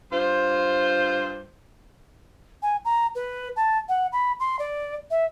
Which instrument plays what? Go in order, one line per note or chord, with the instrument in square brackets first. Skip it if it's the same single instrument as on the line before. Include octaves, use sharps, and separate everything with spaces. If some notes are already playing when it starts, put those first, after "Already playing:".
[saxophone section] G2 F4 C5
[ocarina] G#5
A#5
B4
A5
F#5
B5
C6
D5
E5